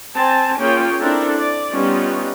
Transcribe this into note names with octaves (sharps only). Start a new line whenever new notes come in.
C4 G#5 A5
A#3 C#4 F4 G#4 C#5 G5
C4 D4 E4 A4 A#4
D5
G3 B3 C#4 D#4 F4